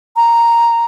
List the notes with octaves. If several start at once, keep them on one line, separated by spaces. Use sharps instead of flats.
A#5